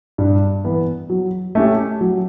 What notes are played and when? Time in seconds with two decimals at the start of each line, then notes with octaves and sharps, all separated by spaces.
0.18 G2
0.65 E3 B3
1.10 F#3
1.55 A3 C#4 G4
2.01 F#3